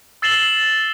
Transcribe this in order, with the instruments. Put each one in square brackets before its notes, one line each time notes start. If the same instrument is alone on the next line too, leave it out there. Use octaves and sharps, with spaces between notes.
[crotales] E6 A6 C7 E7 F#7 G7